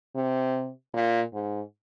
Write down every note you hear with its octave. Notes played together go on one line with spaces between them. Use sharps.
C3
A#2
G#2